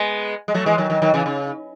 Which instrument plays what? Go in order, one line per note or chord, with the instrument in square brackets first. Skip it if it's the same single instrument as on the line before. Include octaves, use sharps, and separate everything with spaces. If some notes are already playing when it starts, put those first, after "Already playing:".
Already playing: [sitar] G#3 B3
G#3
F#3 A3
E3 G#3
D#3 F#3
D#3 F#3
D#3 F#3
C#3 E3
C#3